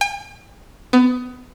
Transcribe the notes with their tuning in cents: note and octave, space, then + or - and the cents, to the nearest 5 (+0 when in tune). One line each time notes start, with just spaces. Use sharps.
G5 +45
B3 +25